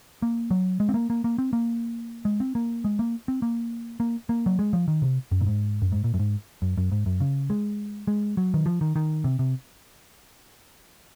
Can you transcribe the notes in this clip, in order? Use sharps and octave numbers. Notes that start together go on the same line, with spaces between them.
A#3
F#3
G#3
C4
A#3
A#3
A#3
C4
A#3
G#3
C4
A#3
G#3
A#3
C4
A#3
A#3
A#3
F#3
G#3
F3
D#3
C3
F#2
A#2
G#2
F#2
G#2
A#2
F#2
G#2
F#2
F#2
G#2
F#2
C#3
G#3
G#3
F#3
D#3
F3
D#3
D#3
C3
C3